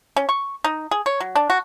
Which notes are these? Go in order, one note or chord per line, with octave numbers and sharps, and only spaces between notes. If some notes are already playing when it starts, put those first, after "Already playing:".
C#4
C#6
D#4
G#4
C#5
F#3
D4
F#4